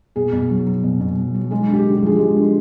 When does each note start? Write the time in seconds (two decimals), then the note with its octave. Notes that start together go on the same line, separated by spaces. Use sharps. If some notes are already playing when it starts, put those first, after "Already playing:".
0.16 B2 G#4
0.32 B2
0.49 F#3
0.66 F#3
0.84 B2
1.00 B2
1.17 F#3
1.34 F#3
1.51 G#3 G#4
1.68 D3
1.74 G4
1.85 D3
1.97 G4
2.03 F3 G#4
2.16 G#3 G4
2.36 D3